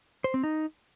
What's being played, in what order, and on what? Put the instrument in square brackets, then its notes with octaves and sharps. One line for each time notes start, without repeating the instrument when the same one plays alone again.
[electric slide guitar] C5
C4
D#4